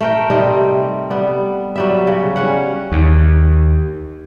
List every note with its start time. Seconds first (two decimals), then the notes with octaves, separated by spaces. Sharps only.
0.01 A3 A#4 G5
0.30 C3 G3 C4 D#4
1.10 G3 B3
1.76 F#3 G3 E5
2.07 C#3
2.36 G3 C#4 F#5
2.92 D#2